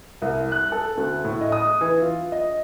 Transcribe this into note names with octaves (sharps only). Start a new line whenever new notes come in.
C2
F#6
A4
D2
A2
D#5
D#6
E3
F4
D#5